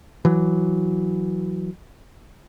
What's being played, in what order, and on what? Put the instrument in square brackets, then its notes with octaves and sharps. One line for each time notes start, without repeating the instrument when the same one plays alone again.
[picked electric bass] E3 F#3